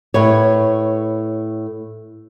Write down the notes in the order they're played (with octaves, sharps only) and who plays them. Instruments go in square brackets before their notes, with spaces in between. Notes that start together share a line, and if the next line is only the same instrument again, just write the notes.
[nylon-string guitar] A2 B4 C#5